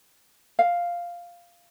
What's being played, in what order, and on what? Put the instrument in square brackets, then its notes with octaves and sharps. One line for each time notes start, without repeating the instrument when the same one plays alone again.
[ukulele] F5